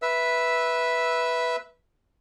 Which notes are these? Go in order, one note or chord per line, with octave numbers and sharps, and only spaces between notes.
B4 E5 E6